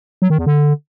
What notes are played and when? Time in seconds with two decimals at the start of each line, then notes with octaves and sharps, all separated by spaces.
0.22 F#3
0.30 D#3
0.38 E2
0.46 D3